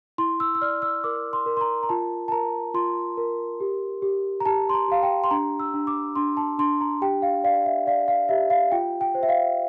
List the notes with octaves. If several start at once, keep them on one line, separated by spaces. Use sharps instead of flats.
E4 C6
E6
E6
D5 F6
E6
A#4 D6
C6
A#4
C6
A#5
A#5
F4 A5
A5
A#4 A#5
F4 C6
A#4
G4
G4
A#5
G4 A5
C6
A#5
G4 F5
G5
C6
D4 A#5
E6
D4
D6
D4 C6
A5
D4 C6
A#5
G4 G5
F5
D5 F5
E5
D5 F5
F5
G4 E5
F5
F4 G5
G5
C5
E5
F5